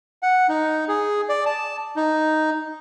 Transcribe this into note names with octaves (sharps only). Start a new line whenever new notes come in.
F#5
D#4
G#4
D5
A5
D#4